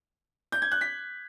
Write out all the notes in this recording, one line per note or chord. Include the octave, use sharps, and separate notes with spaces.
G6
G#6
F#6
B6